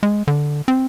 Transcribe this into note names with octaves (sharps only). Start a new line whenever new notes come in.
G#3
D3
C4